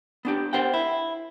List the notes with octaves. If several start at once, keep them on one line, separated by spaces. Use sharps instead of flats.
B3 D4 G4
A#4 C5 F#5 G5
E4